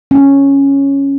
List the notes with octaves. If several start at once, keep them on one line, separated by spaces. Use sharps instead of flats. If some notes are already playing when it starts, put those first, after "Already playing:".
C#4